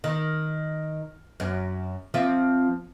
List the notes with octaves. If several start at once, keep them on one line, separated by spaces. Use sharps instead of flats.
D#3
F#2
F3 C4 E5